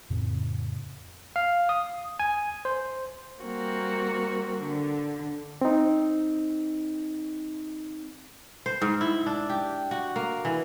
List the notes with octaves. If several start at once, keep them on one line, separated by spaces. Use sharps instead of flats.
F2 A2 C#3 C4
F5
D#6
G#5
C5
G3 A#3 C4 F#4
D3
C4 D#4
C5
G#2
E4
D4
G4
F#4
A#3
E3